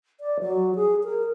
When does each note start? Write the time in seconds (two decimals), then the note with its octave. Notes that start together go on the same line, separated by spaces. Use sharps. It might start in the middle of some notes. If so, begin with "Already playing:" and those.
0.21 D5
0.40 F#3
0.75 G#4
1.04 A#4